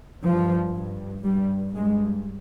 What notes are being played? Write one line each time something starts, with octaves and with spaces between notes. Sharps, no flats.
G2 F3
G2
G2 G3
G2 G#3